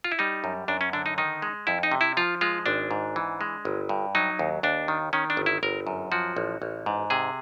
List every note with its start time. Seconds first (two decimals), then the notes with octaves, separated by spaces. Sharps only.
0.04 F4
0.12 E4
0.19 G3 D#4
0.44 F#2
0.68 F#2 D4
0.81 C#4
0.93 D3 D4
1.06 D#4
1.18 D#3 D#4
1.42 G#3
1.67 F2 E4
1.83 D#4
1.92 C3
2.01 E4
2.17 F3 F4
2.41 G#3 F4
2.66 G#1 D4
2.91 G#2
3.16 E3
3.41 G#3
3.65 G1
3.89 G2
4.15 F#3 D#4
4.39 D#2
4.63 D#2 D4
4.88 D#3
5.13 D#3 C#4
5.30 D4
5.37 G1
5.46 E4
5.63 G1 A#4
5.87 F#2
6.12 F3 F#4
6.37 A1
6.62 A1
6.86 G#2
7.10 C3 G#4